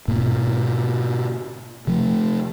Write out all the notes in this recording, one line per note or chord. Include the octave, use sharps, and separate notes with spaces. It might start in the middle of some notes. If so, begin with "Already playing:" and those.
G#2 B2 A#3
C3 F3 A3